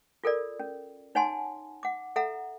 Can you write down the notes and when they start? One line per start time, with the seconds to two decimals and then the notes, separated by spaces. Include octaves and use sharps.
0.24 F4 A4 A#4 D5
0.60 C#4
1.15 D#4 C#5 F#5 G#5 A5 C6
1.83 F#5 D6
2.16 A4 E5 F#5 A#5